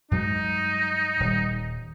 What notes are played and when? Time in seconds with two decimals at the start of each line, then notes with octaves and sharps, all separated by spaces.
0.11 G2 F#3 G#3 D#4
1.20 D#1 G3